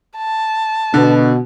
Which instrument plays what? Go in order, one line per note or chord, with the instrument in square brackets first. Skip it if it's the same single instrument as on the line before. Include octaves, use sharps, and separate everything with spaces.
[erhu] A5
[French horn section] B2 [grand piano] D3